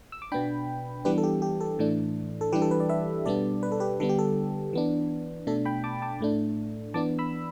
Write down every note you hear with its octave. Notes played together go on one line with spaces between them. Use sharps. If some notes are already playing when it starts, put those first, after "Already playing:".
E6
D6
B2 B3 D4 G5 B5
E3 G3 B3 D4 G4 B4
A4
G4
G4
A4
A2 E3 A3 D4
A4
E3 G3 D4 G4 B4
A4
B4
D5
B4 E5
B2 G3 B3 D4 A4 D5
B4
A4
G4 B4
D3 G3 B3 D4 A4
G4
A4
E3 B3 D4
B2 A3 D4 A4
G5 B5
A5 D6
A5 D6
A2 A3 D4
E3 B3 D4 A5 D6
B5 E6